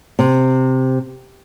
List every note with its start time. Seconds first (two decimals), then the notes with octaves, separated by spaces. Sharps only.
0.19 C3